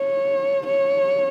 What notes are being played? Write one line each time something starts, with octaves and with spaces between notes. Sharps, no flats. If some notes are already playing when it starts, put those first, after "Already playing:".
Already playing: C#5
C#5